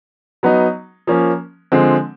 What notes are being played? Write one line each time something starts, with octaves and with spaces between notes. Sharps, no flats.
F#3 B3 D#4
F3 A#3 C#4
D3 F3 G#3 C4